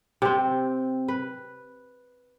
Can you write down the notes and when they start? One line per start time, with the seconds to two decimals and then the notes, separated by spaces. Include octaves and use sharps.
0.22 C3 C4
1.08 B4